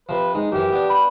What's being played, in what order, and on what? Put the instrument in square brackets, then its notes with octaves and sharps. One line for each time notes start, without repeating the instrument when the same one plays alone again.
[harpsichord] C3 F3 [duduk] B4
[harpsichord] G#3 [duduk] D#4
[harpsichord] F#2 E3 [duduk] G4
[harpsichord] B3 D4
[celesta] B5